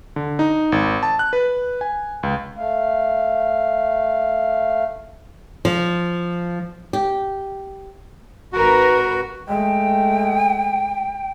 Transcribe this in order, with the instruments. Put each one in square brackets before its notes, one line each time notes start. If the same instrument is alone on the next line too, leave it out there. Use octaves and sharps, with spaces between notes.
[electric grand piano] D3
D#4
G#1
A5
F#6
B4
G#5
C#2
[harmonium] A3 F5
[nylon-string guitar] F3
G4
[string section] G#1 A#4 B4 [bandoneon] F#4
[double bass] G#3 A3 [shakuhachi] G5